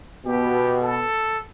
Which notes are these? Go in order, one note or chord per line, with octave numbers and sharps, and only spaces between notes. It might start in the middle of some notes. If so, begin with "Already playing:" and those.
B2 G4
A4